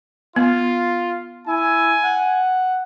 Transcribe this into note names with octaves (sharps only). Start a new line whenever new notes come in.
B3 F4
E4 G#5
F#5